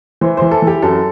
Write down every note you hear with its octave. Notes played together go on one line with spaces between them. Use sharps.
E3 C5
E3 C5
A4
E3
G4
F#2 A4